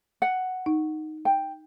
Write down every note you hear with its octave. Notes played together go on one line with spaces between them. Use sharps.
F#5
D#4
G5